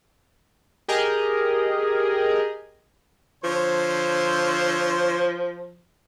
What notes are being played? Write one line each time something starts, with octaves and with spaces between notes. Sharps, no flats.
G4 G#4 A#4 D#5
D3 F3 C5 C#5